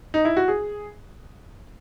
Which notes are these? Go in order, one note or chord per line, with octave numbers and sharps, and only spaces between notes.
D#4
E4
F#4
G#4